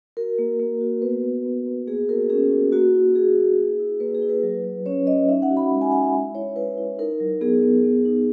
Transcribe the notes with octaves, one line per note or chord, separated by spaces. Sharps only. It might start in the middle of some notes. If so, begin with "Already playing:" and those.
F#4 A#4
A#3
A#3
F#4
B3 B4
B3
B3
B3
A#3 G#4
F#4 A#4
C#4 G#4
F#4
A#3 F#4
E4
A#3 G#4
A#3
E4
E4
A#3 B4
G#4
E4
B4
F#3
F#3
C#4 C#5
C#4 D#5
D#4 E5
F#5
F#4
B5
G#3
G#5
G#3 F#5
E5
E4
E4 C#5
E4 B4
E4
D#4 A#4
F#3
B3 G#4
B3
B3
D#4